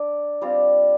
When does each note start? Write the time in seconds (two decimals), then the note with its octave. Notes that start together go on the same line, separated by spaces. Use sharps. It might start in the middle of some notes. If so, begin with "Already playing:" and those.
Already playing: D4 D5
0.41 G3 C4 F4